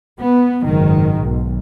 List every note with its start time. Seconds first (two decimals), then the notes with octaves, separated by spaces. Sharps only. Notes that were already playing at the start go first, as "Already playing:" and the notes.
0.21 B3
0.66 F#1 G#2 D#3
1.22 B1